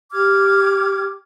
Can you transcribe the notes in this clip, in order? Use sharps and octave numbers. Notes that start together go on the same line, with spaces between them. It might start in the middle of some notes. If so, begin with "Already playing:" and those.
G4 D6 F6 G#6